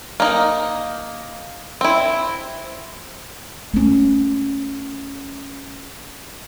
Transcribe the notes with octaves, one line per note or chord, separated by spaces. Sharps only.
A#3 D#4
C4 E4
A3 C#4